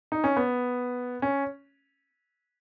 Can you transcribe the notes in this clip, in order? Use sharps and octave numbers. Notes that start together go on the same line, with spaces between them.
D#4
C#4
B3
C#4